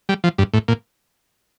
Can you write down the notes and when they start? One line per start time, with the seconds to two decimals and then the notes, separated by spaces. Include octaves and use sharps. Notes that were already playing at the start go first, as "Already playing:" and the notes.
0.09 G3
0.24 F3
0.38 G2
0.54 A2
0.68 A#2